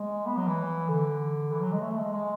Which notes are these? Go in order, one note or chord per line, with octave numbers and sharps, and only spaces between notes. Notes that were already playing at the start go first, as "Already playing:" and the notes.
Already playing: G#3
B3
F#3
E3
D3
E3
F#3
G#3
A3
G#3
G#3